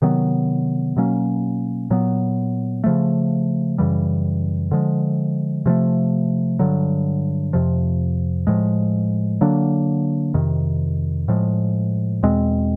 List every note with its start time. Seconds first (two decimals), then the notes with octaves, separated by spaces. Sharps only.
0.02 C3 D#3 F#3 B3
0.96 B2 F#3 A#3 C#4
1.91 A#2 F#3 B3
2.84 C#3 F3 A3
3.78 F#2 C#3 E3 G3
4.71 D3 F3 G#3
5.66 C3 F3 A3
6.59 G2 D3 F#3
7.53 F2 C3 F3
8.47 A2 F3 G#3
9.41 D3 F#3 A#3 D4
10.34 F2 C3 D#3
11.28 A2 F3 G#3
12.23 E2 B2 G#3 C4